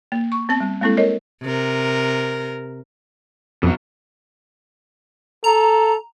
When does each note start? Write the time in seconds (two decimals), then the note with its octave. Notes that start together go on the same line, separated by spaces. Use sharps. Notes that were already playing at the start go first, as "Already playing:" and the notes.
0.12 A#3
0.32 C#6
0.49 B3 C4 A5
0.60 G3
0.81 G#3 A#3 C4 E4 A4
0.97 A#4 C#5 D#5
1.43 C3 A#4
3.63 F2 B2 F#3
5.44 A4 A#5